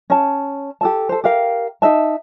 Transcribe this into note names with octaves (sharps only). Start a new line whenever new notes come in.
C#4 A5
G4 A4 A5
A4 C5
G4 A#4 F5 G5
D#4 D#5 E5 A5